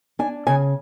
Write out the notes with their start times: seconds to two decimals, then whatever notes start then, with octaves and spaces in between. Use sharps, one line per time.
0.19 D4 G#5
0.47 C#3 G#5